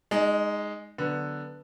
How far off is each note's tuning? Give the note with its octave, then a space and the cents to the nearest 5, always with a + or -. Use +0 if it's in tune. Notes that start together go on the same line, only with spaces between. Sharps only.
G#3 +0 D#4 +0 D#5 -45
D3 +0 F#3 +0 B3 +0